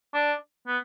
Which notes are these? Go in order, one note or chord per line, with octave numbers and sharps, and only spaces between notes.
D4
B3